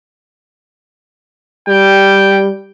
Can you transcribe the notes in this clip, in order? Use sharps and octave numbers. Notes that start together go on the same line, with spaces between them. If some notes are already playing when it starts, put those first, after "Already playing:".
G3 G5